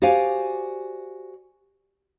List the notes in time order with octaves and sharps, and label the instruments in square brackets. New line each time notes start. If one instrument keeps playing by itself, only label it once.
[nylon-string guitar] F#4 G4 C5 D5 F5 G#5